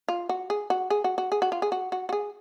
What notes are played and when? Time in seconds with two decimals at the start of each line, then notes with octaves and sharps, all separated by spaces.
0.08 F4
0.29 F#4
0.50 G#4
0.70 F#4
0.90 G#4
1.04 F#4
1.18 F#4
1.32 G#4
1.42 F#4
1.52 F4
1.62 G#4
1.72 F#4
1.92 F#4
2.09 F#4
2.13 G#4